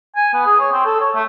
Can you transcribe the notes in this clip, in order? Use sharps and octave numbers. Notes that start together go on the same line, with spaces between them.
G#5
B3
G#4
C#5
C4
A4
C#5
A3